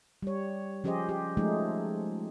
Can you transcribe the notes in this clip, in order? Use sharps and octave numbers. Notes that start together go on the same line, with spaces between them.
G3 C#5
F3 C#4 G4 G#4 C5 D#5
G4
F3 G#3 A3 D#4 G#4